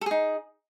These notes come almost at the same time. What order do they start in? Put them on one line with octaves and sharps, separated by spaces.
A4 G#4 D#4